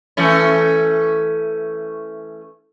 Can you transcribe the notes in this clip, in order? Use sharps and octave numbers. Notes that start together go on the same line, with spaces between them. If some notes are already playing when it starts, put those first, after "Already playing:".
E3 A3 C#4